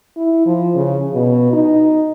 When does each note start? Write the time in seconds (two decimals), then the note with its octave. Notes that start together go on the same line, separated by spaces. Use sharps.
0.17 E4
0.46 F3
0.75 C#3
1.14 B2
1.53 D#4